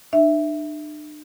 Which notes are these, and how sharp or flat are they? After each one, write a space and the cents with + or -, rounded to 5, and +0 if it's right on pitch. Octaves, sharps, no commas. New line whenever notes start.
D4 +45 E5 +0